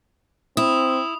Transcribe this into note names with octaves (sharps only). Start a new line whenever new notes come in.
C4 E4 D#6